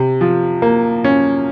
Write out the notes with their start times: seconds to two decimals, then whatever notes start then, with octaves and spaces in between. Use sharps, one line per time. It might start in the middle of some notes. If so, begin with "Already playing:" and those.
Already playing: C3
0.21 F3
0.62 A#3
1.04 C#4